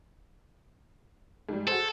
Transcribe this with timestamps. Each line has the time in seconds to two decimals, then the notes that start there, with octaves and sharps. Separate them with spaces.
1.49 G#2 G3
1.68 F#4 G#4 A4 C5